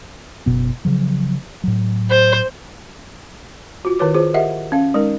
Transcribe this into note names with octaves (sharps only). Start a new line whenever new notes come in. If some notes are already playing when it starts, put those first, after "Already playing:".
F#1 B2 B3
C#3 F3 F#3
A2 F#3
C5
F4 F#4
D#3 E4 B4 C#5 D6
F4 G#4 C5
G4 A#4 D#5 E5 F#5
C#4 F5
G#3 D#4 A#4